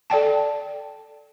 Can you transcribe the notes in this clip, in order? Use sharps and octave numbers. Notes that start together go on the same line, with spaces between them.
A4 D5 G5 A5